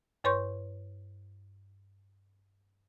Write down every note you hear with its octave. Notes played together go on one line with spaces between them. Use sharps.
G2 B4 C#5 C6 C#6 G6